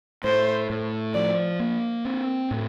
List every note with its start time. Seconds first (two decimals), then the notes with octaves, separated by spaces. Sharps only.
0.24 A2 C5
0.70 A2
1.14 F3 D5
1.60 A#3
2.05 C4
2.51 A2